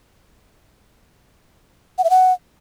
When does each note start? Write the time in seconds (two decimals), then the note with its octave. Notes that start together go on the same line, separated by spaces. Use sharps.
1.98 F#5
2.04 E5
2.10 F#5